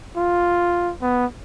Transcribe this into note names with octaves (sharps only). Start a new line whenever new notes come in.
F4
B3